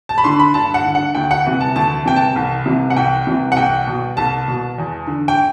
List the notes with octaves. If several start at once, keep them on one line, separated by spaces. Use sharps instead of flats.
A5
B5
D3 C6
B5
G2 A5
F#5
D3
F#5
D2 G5
F#5
C3 E3
A5
D2 A5
C3 E3 G5
A5
C2
C3 E3
F#5
C2 G5
C3 E3
F#5
C2 G5
B2
C2 A5
B2
E2
D3
G5